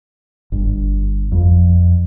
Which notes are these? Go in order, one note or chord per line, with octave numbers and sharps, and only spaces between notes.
G1
F2